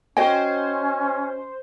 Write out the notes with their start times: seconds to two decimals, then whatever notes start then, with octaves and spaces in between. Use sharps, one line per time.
0.17 C#4 F#4 C5 D#5 G5 G#5